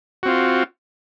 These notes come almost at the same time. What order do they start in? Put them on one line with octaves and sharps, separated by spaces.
F#4 C4 F4